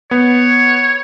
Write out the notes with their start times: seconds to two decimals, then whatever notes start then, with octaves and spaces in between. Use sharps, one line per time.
0.11 B3 C#5